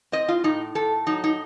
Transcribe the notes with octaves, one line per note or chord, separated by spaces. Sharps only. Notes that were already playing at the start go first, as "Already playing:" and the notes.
C4 D#5
F4
A2 D#4
A2 A4
F#3 D#4
D#4